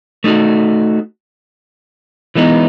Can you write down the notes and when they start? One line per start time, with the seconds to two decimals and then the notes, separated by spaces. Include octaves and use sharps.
0.24 A3 D#4 F#4
2.35 E3 G#3 B3 D#4